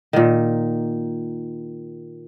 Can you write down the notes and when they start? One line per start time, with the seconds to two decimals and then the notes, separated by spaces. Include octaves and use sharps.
0.13 A#2 D#3